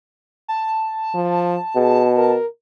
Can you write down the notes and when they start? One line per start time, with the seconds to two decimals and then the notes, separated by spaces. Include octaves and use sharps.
0.48 A5
1.15 F3
1.76 B2 G#4
2.17 A#4